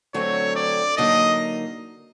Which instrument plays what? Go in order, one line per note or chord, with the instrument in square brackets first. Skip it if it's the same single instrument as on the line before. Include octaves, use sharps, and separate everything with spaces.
[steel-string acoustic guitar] D3 F#3 A3 C4 [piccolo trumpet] C#5
[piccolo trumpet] D5
[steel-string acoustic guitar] D3 F#3 A#3 D#4 [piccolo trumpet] D#5